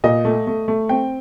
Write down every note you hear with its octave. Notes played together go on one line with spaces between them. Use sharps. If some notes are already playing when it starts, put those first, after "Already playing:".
A#2 D#5
A3
A3
A3
C4 G5